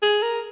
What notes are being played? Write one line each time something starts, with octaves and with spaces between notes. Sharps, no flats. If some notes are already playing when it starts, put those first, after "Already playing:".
G#4
A#4